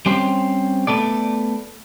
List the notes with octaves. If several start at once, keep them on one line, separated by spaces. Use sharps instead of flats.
G3 C4 C#4 G4 C5
A3 B3 A4 D5